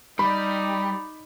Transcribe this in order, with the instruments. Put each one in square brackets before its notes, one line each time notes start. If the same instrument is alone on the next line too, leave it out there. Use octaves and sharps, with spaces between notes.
[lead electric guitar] G3 [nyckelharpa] D#4 D5 [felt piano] B5